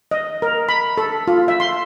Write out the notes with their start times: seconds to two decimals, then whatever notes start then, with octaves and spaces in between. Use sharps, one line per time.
0.11 D#5
0.42 A#4
0.69 B5
0.98 A4
1.28 F4
1.48 E5
1.60 C6